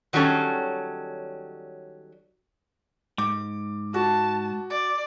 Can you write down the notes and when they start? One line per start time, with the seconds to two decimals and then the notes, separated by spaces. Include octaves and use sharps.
0.13 D#3 F#3 G3 C#4 A4
3.18 G#2 D6
3.94 F#4 A5
4.70 D5